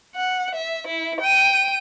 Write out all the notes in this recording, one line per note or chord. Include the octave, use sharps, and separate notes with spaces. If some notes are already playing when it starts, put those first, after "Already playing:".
F#5
E5
E4
G5 D#7